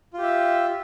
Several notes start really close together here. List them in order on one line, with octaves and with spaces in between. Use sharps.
F4 G4 E5